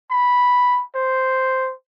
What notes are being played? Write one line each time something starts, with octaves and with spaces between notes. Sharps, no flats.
B5
C5